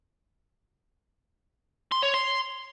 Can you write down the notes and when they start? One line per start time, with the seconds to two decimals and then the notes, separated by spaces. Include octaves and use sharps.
1.92 C6
2.03 C#5
2.14 C6